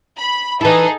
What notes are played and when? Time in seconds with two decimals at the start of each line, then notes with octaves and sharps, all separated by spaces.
0.18 B5
0.61 E3 D#4 E4 G#4 A4